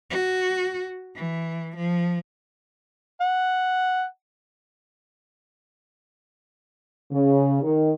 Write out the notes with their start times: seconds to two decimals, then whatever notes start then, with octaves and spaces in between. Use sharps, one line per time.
0.10 F#4
1.15 E3
1.76 F3
3.21 F#5
7.12 C#3
7.63 D#3